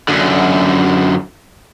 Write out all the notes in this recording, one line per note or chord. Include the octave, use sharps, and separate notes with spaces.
F#2 D3